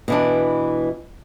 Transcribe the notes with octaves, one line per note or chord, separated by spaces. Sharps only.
B2 E3 D4